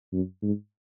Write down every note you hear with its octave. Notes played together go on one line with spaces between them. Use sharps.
F#2
G#2